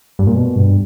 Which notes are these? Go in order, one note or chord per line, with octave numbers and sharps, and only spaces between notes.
G2
A#2
B2
G2